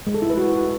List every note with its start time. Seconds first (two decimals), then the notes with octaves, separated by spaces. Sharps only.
0.07 G#3
0.14 A4
0.22 E4
0.30 B4
0.38 F#4